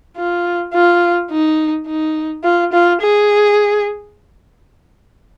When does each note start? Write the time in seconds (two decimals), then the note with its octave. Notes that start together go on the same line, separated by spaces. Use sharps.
0.17 F4
0.74 F4
1.31 D#4
1.87 D#4
2.44 F4
2.72 F4
3.01 G#4